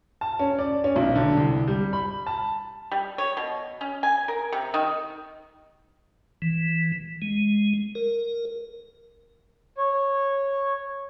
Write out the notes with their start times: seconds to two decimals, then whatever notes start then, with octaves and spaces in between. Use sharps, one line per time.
0.21 A5
0.39 C#4
0.59 D5
0.84 C#4
0.96 B1
1.16 D3
1.37 C2
1.68 G3
1.93 B5
2.26 A5
2.92 G3
3.18 C#5
3.37 B2
3.81 C#4
4.03 G#5
4.28 A#4
4.52 C3
4.74 D#3
6.42 E3
7.22 G#3
7.95 A#4
9.77 C#5